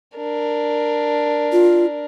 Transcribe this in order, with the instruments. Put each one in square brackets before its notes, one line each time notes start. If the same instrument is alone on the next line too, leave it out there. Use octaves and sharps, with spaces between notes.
[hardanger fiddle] D4 A#4
[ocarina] F4